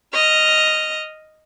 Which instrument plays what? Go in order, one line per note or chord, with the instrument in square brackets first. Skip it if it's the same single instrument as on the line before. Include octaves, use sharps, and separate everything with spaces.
[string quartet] D#5 F6